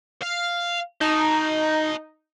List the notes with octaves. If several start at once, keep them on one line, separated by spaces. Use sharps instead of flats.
F5
D#4 D#5 A5